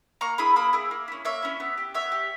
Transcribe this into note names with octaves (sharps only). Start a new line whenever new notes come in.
A#3 A#5 C#6
E4 G#4 B5 D#6
A#3 B5 D#6
E4 G#4
A#3
C#4 E4
A#3 C#5 E5
C#4 E4
B3
G4
B3 C#5 E5
G4